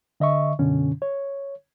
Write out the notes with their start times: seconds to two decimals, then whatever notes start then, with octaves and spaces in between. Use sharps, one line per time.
0.20 D3 D#5 E5 C#6
0.59 F#2 B2 D3 C#4
1.02 C#5